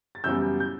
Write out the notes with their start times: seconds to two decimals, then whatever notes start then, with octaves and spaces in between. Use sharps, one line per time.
0.15 A6
0.24 F#2 C#3 E3 G3 B3 E6 G6
0.60 G6